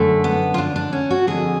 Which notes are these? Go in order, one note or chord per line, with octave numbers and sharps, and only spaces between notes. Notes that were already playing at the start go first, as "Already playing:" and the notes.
Already playing: F#2 D3 A3
B3
F4
D4
D4
C#4
F#4
F2 D3 G#4